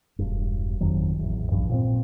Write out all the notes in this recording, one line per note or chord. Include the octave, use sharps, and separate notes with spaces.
E1 G2
G1 F2 D#3 F#3
A1 E2
A#1 G2 F3
A#2 F3 C4